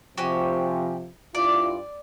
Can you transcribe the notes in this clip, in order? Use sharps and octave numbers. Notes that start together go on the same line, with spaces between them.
C3 F3 F#4 G4 G#5
G2 E4 F4 D5